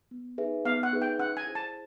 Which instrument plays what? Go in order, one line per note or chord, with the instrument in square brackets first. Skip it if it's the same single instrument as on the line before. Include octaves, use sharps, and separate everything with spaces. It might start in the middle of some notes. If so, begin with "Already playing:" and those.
[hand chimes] B3
D#4 G#4 B4 E5
[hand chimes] B3 [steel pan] F5
[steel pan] F#5
[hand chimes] D#4 G#4 B4 E5
[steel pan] G5
[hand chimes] C#4 [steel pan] F#5
[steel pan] G#5
[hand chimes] E4 G#4 C5
[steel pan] A5